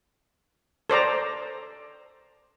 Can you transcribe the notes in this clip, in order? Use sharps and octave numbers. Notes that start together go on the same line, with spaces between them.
A4 C5 D5 A#5